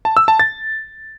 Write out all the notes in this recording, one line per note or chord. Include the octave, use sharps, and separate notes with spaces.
A5
E6
A5
A6